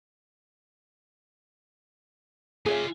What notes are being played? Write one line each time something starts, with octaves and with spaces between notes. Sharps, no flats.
F4 G#4 C#5 E5 G#5